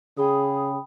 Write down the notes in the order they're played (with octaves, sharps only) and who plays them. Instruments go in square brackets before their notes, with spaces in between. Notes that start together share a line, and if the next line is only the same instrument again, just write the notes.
[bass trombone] C#3 [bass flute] G#4 [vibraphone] G5 B5 D#6